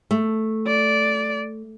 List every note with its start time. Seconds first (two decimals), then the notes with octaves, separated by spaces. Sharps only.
0.11 A3
0.67 D5